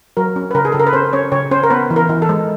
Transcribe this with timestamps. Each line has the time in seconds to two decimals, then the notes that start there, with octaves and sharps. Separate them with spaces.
0.17 F#3 A#4
0.36 C#4
0.51 B4
0.55 C#3 A#4
0.65 G#4
0.72 C#3 A4
0.80 A#4
0.87 B4
0.93 C#4 C5
1.13 C#4 C#5
1.32 C#3 C#5
1.51 C#4 C5
1.63 A#4
1.70 B3 B4
1.90 E3
1.96 A#4
2.09 E3
2.22 A4
2.29 G#3